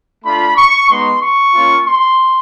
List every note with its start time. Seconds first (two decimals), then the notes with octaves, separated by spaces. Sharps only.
0.25 A3 D4 F4 B5
0.57 C#6
0.90 G#3 B3 D#4 C6
1.22 C#6
1.54 A#3 C#4 F4
1.87 C6